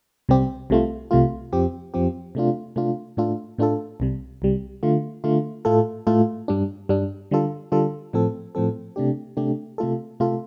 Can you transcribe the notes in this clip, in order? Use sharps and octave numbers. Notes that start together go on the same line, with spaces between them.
C2 C3 G3 C4 G4
C2 C3 A3 F4
C2 C3 A3 F4
F2 F3 C4 G4
F2 F3 C4 G4
C3 A3 D4 F4
C3 A3 D4 F4
A2 A3 D4 F4 A4
A2 A3 D4 F4 A4
C2 C3 G3
C2 C3 G3
D3 A3 F4
D3 A3 F4
A2 A3 F4 A4
A2 A3 F4 A4
G2 G3 D4
G2 G3 D4
D3 G3 F4 A4
D3 G3 F4 A4
A2 F3 C4 A4
A2 F3 C4 A4
C3 A3 D4 G4
C3 A3 D4 G4
C3 A3 F4 A4
C3 A3 F4 A4